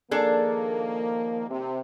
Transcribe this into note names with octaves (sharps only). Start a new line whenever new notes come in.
D#3 F3 A#3 D4 G#4 A4
C3